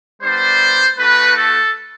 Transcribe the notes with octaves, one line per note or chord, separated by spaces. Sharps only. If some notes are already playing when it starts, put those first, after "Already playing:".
G3 B3 D4 C5
A3 D4 F#4 B4
A4